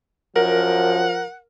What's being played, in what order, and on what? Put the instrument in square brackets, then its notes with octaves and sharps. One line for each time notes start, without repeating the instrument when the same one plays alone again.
[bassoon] F#2 [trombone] F3 [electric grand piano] A#4 [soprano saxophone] F#5